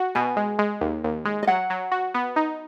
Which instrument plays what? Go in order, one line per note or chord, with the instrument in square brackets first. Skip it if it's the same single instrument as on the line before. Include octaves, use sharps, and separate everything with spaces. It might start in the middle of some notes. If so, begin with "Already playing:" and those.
Already playing: [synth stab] F#4
[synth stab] B2 [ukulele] G#5
[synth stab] G#3
G#3
D#2
D#2
G#3
[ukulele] D#5
[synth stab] F#3 [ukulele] F#5
[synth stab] F#3
F#4
B3
D#4